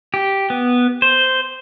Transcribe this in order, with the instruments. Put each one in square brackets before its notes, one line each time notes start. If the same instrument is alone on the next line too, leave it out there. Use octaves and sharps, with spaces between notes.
[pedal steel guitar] G4
B3
C5